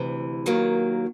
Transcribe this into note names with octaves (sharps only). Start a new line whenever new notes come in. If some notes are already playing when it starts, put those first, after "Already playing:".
Already playing: D2 C3 E3
D#2 D#3 F#3 A#3